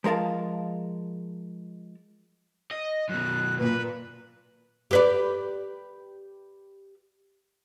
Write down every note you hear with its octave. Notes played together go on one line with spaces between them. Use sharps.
F3 G#3 A#4 F5 A5
D#5
F#2 B2 F#6
A#2 B4
G4 B4 D5